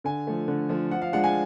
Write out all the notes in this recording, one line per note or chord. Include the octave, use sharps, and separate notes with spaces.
D3 G#5
F3 A3
D3
F3 A3
F3 F#5
F5
G#3 D4 F4 F#5
G#5